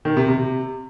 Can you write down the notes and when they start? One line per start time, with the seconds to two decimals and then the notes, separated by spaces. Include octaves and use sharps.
0.05 D#3
0.17 C3
0.28 C3